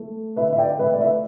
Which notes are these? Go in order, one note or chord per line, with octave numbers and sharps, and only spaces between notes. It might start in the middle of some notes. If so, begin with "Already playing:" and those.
Already playing: A3
D3 B4 E5
E5
D5 G5
A3 B4 E5
D5
B4 E5